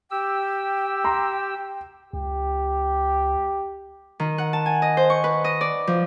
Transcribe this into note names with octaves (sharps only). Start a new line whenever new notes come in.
G4 G5 E6
A#5 C6
C#2 G4
D#3
F#5
A5
G#5
D#5
C5
C#6
B4
D#5
D5
F3